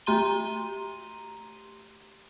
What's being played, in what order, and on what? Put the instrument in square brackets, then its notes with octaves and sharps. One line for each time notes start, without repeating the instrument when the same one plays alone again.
[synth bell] A3 G4 A#5 C6 D#7 G7